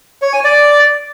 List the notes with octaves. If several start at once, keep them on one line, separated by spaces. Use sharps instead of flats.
C#5
G#5
D5